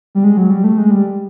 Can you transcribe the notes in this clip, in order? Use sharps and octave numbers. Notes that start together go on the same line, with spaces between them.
G3
G#3
F#3
G3
A3
G#3
G3